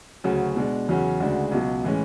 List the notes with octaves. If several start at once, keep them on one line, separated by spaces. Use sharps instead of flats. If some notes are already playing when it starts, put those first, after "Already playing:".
D2 C#3 F#3 C#4 F#4
B2 G#3 D4
E2 C#3 F#3 C#4 F#4
D2 C#3 G#3 D4 F#4
C#2 B2 F#3
A2 E3 G#3 C#4